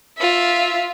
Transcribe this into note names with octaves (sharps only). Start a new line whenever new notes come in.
F4 E5